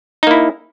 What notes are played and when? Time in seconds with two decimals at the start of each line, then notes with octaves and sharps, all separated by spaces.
0.23 D#4
0.27 A#3
0.31 E4